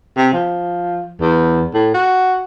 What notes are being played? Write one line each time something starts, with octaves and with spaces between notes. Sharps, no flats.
C3
F3
E2
A2
F#4